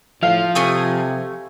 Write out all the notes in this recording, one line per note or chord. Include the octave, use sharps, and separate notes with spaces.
A2 F3 F5
C3 A3 G#5 D#6